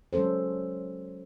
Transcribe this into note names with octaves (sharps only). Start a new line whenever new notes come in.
F#3 G#3 C#4 A4 C5